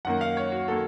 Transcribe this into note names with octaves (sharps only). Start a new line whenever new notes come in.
F#2 D#3 A#3 F#5
F5
C#5
F#4
D#3 A#3 A4